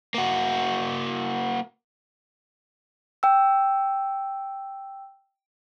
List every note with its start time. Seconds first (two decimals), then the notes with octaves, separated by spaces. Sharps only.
0.14 A#3 F#4
3.23 G5 E6